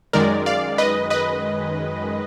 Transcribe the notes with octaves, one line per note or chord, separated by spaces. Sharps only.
F#2 D#3 G#3 A#4 D5
D5 F5
B4 D#5
B4 D#5